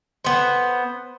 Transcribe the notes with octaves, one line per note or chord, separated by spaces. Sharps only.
B3 C5